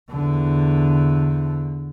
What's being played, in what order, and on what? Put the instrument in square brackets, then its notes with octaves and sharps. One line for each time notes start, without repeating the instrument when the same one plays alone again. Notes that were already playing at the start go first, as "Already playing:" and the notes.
[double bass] E2 D3